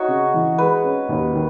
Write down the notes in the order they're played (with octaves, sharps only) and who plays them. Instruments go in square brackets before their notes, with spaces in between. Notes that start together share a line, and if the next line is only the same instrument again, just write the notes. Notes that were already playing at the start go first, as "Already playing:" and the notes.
Already playing: [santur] D#4 F#4 C#5
[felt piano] C#3
E3
[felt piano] G#3 [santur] B4
[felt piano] C#4
D#2
D#3